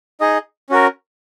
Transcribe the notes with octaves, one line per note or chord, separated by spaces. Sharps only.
D#4 G#4 D#5
C#4 F#4 A#4